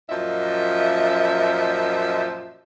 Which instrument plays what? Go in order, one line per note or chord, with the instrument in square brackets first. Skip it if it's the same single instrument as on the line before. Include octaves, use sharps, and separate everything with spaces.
[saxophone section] F#2 A#2 F3 D#5 E5